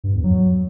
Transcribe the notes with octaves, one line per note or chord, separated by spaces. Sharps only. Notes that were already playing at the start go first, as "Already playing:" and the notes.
G2
E2
F#3